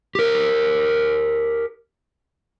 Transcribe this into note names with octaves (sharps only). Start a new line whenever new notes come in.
G4 A#4